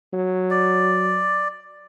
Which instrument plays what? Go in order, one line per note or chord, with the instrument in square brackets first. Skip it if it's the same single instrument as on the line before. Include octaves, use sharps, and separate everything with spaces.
[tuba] F#3
[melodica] D5